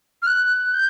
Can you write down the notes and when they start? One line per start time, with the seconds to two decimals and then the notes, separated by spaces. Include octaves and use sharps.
0.22 F6
0.27 F#6
0.74 G6